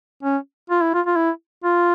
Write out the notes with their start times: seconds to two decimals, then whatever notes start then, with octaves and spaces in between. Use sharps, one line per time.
0.23 C#4
0.70 F4
0.82 E4
0.94 F4
1.06 F4
1.16 E4
1.64 F4